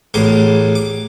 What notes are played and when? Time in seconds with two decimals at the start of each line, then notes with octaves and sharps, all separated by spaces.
0.14 A1 E2 A2 C6 D6
0.75 D6